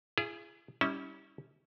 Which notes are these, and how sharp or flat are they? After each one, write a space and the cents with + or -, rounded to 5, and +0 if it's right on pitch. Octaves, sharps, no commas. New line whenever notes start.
E4 +45 G#4 +0
G3 +0 C#4 +0 E4 -35